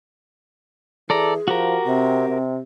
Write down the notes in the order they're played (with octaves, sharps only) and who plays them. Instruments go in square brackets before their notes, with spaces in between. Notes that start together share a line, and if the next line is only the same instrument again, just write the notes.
[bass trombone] E3 [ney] G#4 [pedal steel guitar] A4 D5 A#5
[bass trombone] F3 [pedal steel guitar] F#4 G4 A#4
[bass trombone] C3 [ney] C4
[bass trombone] C3